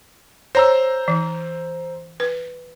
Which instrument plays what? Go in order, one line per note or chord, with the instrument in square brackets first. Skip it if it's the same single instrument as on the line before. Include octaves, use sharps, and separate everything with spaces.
[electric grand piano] C5 A#5 E6 [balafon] C#5
[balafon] E3
B4